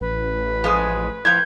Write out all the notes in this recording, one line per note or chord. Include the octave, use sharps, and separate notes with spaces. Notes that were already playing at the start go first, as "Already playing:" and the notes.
A1 B4
F3 G#3 G#4
A2 F3 G6 G#6